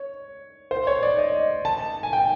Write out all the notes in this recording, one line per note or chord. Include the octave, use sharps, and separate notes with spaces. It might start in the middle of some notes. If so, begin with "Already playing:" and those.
Already playing: C#5
C5
C#5
D5
D#5
A5
G#5
G5